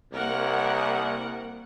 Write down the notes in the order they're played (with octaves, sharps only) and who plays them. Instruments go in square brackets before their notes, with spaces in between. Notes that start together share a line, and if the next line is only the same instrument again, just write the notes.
[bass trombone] C2 [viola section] A#3 A#4 F#5